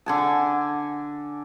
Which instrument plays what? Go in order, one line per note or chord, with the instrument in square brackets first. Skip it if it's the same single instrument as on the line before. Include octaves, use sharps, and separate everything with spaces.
[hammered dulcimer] D3 G#5 A5